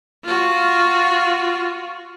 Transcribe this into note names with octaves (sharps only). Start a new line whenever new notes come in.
F4 F#4